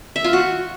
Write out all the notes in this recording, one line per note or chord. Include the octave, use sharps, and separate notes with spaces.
E5
F4
F#4